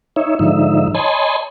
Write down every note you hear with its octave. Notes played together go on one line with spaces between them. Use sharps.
D#4 C#5 E5
G#2 D3 F3 D#4 E5
C#5 D#5 G#5 A5 B5 C6